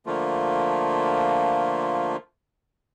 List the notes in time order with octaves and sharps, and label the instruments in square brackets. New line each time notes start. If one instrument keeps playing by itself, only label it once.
[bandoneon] D3 F3 A3 A#3 F4